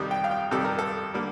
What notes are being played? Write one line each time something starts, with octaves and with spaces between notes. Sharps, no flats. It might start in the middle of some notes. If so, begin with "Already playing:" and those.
Already playing: F2 C3 D#3 G3
G5
F5
G5
F2 C3 D#3 G3 A4
A#4
A4
D3 G3 A#3